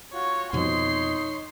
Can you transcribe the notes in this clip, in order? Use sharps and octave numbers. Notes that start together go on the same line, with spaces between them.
F4 F#4 C#5
F2 B2 F3 D#4 C#5 C6 C7